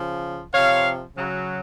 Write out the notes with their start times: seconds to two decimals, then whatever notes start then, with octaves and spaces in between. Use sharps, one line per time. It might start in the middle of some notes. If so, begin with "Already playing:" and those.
Already playing: C#3 F3
0.54 C3 F3 C#5 F5
1.17 C#3 F#3